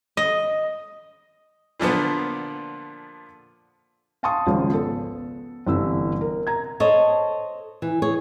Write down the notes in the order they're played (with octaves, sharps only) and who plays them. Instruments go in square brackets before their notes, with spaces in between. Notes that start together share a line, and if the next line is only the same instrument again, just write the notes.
[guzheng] D#5
[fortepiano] A#2 D3 F3 B3
[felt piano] F5 G#5 A5 C6 C#6 D#6
G#1 C#2 C#3 F3
B3 A4
G1 C3 E3 E6
A#4
A#5 G#6
[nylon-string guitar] A4 C5 C#5 D#5
E3
G#4 C#5